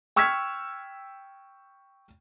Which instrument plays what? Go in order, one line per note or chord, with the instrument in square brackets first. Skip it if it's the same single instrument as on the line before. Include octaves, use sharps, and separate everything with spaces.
[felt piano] G5 C#6 E6 F6 G#6 B6